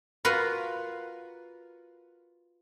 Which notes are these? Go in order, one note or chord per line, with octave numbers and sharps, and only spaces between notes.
F4 F#4 A#4 B4 F#5